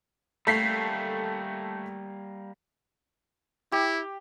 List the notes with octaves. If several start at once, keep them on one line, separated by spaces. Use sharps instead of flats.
G3 A3 A#3 B6 C7
E4 G4